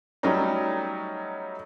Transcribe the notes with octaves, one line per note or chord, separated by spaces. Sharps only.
F#3 G3 A3 C#4 D#4